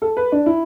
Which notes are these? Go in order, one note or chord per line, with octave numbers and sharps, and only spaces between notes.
A4
B4
D4
E4